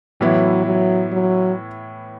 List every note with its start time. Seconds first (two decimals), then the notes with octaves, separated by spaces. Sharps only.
0.21 A2 E3 F#3 B3 E4
0.66 F#3
1.12 F#3